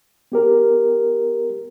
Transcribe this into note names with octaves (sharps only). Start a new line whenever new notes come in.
B3 G4 A#4